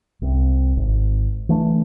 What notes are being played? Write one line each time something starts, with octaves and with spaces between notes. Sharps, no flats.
C2 C3
G#1
E3 A3 D4